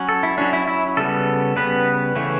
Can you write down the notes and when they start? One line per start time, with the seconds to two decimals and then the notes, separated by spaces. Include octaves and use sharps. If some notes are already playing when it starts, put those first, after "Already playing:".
Already playing: F#3 C#4
0.09 A4
0.23 E4
0.38 F#3 C#4 D4
0.53 E4
0.68 E4
0.97 C#3 G3 B3 A4
1.56 C#3 G3 B3 B4
2.16 C#3 E3 A3 C#4